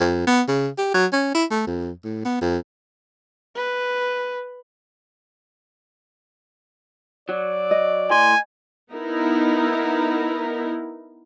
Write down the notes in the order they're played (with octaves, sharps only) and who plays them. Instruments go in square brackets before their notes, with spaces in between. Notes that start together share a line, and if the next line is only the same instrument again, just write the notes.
[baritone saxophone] F2
B3
C#3
G4
F#3
C#4
E4
A3
F2
A2
B3
F2
[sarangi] B4
[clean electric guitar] F#3 [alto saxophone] D5
[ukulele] D#5
[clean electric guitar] A2 C6 [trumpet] G#5
[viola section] B3 D#4 E4 A#4